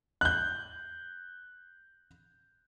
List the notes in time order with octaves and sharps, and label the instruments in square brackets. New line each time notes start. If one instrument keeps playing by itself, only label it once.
[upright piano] F#6 G6